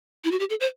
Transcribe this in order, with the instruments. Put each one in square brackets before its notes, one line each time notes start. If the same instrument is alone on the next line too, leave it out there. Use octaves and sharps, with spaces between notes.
[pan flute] E4
F#4
G4
A4
C5